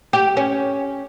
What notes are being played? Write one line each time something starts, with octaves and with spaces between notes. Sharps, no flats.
G4
C#4